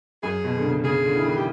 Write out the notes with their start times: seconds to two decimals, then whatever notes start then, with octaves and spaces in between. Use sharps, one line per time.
0.23 F#2 G#4
0.44 B2
0.57 D3
0.64 C#3
0.84 C#3 G#4
1.05 D3
1.16 E3
1.24 D#3
1.37 G4